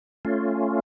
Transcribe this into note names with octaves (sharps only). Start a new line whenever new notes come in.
A3 C#4 F4